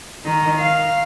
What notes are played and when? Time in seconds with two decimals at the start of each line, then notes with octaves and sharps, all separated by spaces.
0.24 D#3 D#4
0.58 F5